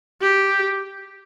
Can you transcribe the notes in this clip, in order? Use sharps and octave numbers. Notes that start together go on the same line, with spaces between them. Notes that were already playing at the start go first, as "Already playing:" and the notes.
G4